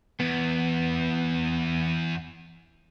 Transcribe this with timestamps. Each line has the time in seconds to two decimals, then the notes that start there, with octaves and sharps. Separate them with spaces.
0.20 E2 B3